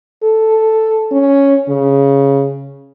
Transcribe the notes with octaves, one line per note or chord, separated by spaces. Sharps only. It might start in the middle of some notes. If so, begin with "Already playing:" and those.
A4
C#4
C#3